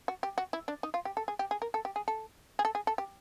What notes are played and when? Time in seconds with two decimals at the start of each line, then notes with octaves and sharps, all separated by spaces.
0.08 F#4
0.23 G4
0.38 F#4
0.53 E4
0.68 D4
0.83 D#4
0.94 F4
1.05 G4
1.17 A4
1.28 G#4
1.39 G4
1.51 G#4
1.62 A#4
1.74 A4
1.85 G4
1.96 G#4
2.08 A4
2.59 G#4
2.65 A4
2.75 G#4
2.87 A4
2.98 G4